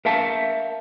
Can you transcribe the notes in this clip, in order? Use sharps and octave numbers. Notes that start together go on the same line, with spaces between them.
A#4 E5 F5 A5